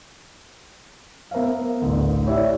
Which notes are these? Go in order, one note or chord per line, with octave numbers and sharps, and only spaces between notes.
B3 A#4 C5 E5 F5
A1 D2
E4 G4 C#5 D5 E5